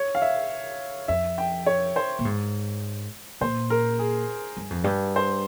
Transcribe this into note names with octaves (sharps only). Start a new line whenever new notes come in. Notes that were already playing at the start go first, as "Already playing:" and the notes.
Already playing: C#5
F5
E5
F2 E5
G5
C#5
C5
A#2
G#2
A#2 C5
A#4
G#4
G2
F2
G2
C5